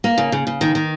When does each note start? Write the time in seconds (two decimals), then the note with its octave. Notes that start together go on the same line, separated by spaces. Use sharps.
0.04 A#3
0.18 C#3
0.32 C#3
0.47 C#3
0.61 D#3
0.75 D#3